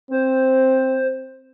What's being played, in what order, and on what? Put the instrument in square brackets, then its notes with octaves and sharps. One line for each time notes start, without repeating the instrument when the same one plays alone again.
[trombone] C4 [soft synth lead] C5